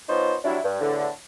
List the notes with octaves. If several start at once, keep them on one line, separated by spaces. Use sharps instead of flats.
F3 B3 D#4 C5 C#5
F#3 G3 D4 E4
G2
E2 A2 D3